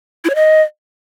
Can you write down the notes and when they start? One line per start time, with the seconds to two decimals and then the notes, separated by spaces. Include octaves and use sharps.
0.25 E4
0.30 C#5
0.35 D#5